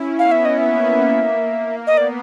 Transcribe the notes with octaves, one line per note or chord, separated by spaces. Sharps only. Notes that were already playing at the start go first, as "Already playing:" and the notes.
Already playing: C#4 E4
B3 F5
E5
D#5
A#3 E5
B3 D#5
D5